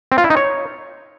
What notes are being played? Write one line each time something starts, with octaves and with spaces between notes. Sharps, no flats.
C4
F4
E4
D#4
C#5